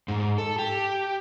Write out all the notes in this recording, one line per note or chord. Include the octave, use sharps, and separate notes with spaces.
G#2
A4
G4